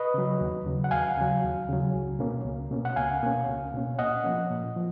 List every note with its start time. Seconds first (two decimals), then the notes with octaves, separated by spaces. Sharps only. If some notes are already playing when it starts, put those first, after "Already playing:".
Already playing: B4 D#5
0.14 C#3 F#3
0.41 D#2
0.66 C#3 F#3
0.84 F#5
0.91 D#2 F5 G#5
1.17 C#3 F#3
1.43 D#2
1.68 C#3 F#3
1.94 C#2
2.19 B2 A#3 C#4
2.45 C#2
2.71 B2 A#3 C#4
2.85 F#5
2.96 C#2 F5 G#5
3.23 B2 A#3 C#4
3.48 C#2
3.74 B2 A#3 C#4
3.99 A#2 D#5 F#5
4.24 F3 A#3 C#4
4.50 A#2
4.76 F3